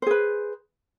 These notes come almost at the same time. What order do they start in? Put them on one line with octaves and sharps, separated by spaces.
C5 G#4 B4